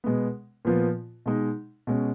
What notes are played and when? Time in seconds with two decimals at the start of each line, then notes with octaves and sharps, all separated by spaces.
0.04 B2 G#3 B3
0.65 A#2 F3 B3 F4
1.26 B2 G#3 D#4
1.87 B2 G#3 C#4